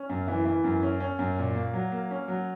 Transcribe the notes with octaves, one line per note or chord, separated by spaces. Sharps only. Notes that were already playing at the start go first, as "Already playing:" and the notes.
Already playing: C#4
F#2
E3
E3
F#2
C#4
C#4
F#2
A#2
A#3
F#3
A#3
C#4
F#3